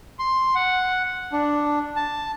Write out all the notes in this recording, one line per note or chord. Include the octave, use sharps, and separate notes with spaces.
C6
F#5
D4
A5